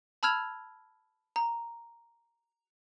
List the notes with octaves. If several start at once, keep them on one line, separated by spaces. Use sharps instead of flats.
A5 B5 E6 F6 G#6 F7
A#5